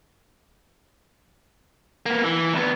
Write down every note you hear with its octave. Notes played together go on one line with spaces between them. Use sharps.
A#3 B3
E3
D2 B3